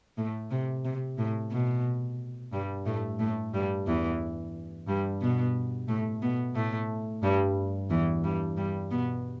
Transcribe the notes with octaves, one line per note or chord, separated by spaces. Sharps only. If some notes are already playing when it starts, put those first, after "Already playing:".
A2 A3
C3
C3
A2
B2
G2 G3
A2 A3
A2 A3
G2 G3
E2 E3
G2 G3
B2 B3
A2 A3
B2 B3
A2 A3
G2 G3
E2 E3
G2 G3
G2 G3
B2 B3